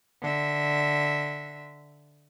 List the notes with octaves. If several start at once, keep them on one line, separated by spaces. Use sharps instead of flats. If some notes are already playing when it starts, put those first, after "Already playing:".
D3 E5